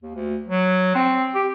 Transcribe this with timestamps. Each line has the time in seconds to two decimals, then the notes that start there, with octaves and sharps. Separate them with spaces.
0.03 D#2
0.15 D2
0.48 F#3
0.95 C4
1.35 G4